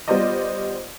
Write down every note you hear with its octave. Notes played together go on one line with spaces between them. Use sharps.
G3 B3 F4 C5 D5 D#5